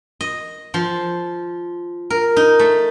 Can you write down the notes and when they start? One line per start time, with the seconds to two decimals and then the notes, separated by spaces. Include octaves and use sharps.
0.21 D#5
0.74 F3
2.10 A#4
2.37 D#4
2.59 A3